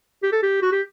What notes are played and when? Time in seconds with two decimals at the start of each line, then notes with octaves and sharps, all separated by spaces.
0.23 G4
0.32 A4
0.43 G4
0.62 F#4
0.72 G4